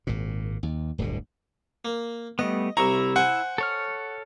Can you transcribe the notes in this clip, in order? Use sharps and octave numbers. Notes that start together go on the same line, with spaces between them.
G#1 A#2
D#2
D1 G1 D2 B2
A#3
G3 A3 B3 D#5
C2 E4 E5 A#5 C#6
C5 F#5 G#5
A4 C#5 F6